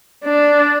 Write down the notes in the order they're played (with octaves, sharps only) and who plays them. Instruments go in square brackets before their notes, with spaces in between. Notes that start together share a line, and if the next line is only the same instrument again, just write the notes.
[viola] D4